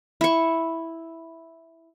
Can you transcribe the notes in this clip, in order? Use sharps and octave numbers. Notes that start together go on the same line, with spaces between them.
E4 C#6